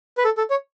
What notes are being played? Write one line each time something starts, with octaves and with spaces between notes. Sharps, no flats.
B4
A4
A4
C#5